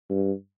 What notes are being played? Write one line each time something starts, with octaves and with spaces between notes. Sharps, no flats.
G2